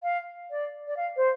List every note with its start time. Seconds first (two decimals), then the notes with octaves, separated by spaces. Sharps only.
0.03 F5
0.50 D5
0.87 D5
0.96 F5
1.16 C5